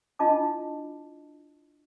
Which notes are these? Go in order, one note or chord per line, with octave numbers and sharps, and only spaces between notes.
D4 E4 F4 D#5 A5 D6